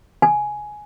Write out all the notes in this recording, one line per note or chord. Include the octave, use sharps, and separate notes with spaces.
G#5